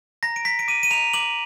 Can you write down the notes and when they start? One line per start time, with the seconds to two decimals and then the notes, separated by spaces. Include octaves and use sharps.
0.23 A#5 A#6
0.36 D7
0.45 A#5 B6
0.59 D7
0.68 D6 D#7
0.83 D#7
0.91 A#5 F7
1.13 D6 F#7